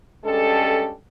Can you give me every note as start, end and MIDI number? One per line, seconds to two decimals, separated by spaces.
0.25 0.92 43
0.25 0.92 56
0.25 0.92 61
0.25 0.92 67
0.25 0.92 69